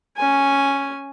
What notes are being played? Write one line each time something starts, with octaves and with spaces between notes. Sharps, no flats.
C#4 G#5